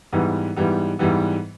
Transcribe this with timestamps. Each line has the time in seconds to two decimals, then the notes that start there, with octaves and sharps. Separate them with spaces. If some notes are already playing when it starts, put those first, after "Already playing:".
0.13 G#2 E3 G3 B3
0.56 G#2 E3 G3 B3
0.99 G#2 E3 G3 B3